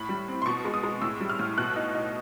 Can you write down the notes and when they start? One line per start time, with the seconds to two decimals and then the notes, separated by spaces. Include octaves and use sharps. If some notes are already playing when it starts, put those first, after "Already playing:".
Already playing: A2 B5
0.09 G3
0.28 C4
0.42 C6
0.46 B2 C#6
0.65 G#3
0.74 D#6
0.83 G#3
1.02 A2 E6
1.21 G3
1.30 F6
1.39 A2
1.58 B2 F#6
1.76 D#4
1.95 D#4